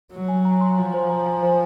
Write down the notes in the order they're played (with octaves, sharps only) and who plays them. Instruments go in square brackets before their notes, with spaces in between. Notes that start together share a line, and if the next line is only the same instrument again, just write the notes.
[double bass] F#3
[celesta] G#5
A#5
C6
[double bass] F3 [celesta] G#5
[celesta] C5
A#5
G#5
C5